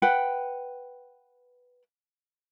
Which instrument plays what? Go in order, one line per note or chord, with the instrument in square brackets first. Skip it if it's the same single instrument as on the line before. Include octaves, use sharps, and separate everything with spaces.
[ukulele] B4 F#5 G5